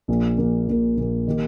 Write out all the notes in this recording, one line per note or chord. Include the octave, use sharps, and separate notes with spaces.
A#1 A#2 A#3
A#1 A#2 A#3
A#1 A#2 A#3
A#1 A#2 A#3
D#3 A#3 G4